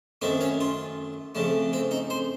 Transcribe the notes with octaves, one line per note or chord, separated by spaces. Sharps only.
F#2 D#3 A3 C4
C#4
F4
F2 C#3 A3
C4
D#4
C5